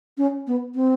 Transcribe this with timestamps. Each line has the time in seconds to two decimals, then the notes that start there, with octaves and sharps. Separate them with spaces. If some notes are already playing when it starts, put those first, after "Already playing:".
0.18 C#4
0.47 B3
0.75 C4